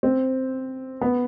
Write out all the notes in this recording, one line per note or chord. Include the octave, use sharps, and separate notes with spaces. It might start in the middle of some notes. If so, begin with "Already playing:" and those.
C4
B3